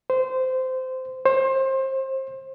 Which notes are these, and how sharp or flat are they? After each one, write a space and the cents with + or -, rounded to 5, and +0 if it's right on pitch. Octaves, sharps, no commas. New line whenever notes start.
C5 -20
C5 +25